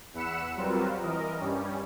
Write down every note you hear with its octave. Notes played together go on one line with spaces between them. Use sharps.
E2 F#5 B5 E6 C#7 E7
F#3 G3 C4 F4 A#4 B4
E3 A#4 D#5
G2 G3 C#4